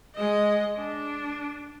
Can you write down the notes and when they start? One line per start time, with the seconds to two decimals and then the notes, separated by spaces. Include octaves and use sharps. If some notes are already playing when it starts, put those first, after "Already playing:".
0.16 G#3 D#5
0.75 D4